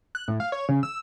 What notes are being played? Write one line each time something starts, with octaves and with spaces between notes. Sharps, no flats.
F#6
A2
F5
C#5
C#3
E6